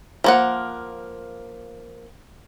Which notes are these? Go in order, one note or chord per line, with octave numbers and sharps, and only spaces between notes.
F3 A#3 F#5